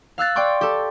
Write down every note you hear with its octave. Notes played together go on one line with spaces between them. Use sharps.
F5 E6 F#6 A6
D5 G5 C6 C#6
G4 A4